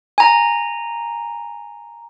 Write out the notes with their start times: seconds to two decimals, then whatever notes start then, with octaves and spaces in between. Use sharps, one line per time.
0.18 G#5 A#5